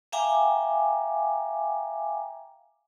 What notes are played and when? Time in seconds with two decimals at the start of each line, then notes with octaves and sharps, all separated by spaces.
0.12 E5 F5 G5 G#5 A#5 D6